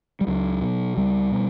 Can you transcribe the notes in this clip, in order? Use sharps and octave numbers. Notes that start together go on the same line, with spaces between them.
G3
C#2 F#3
B2
C#2 G3
B2